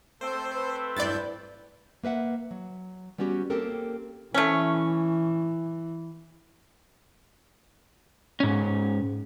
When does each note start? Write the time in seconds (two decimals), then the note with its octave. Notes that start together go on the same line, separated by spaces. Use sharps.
0.21 A3 C4 A4 C5
0.55 B4
0.96 G2 E4 D5 G6 A6
2.03 A#3 B4 E5 F#5
2.51 F#3
3.18 G3 B3 C#4 F#4 G4
3.50 A#3 C4 C#4 G4 A4 A#4
4.34 E3 A3 C#4
8.40 G#2 C#4